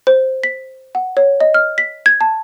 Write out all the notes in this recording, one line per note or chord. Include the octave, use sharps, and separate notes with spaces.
C5
B6
F#5
C#5
D#5
F6
B6
G#6
A5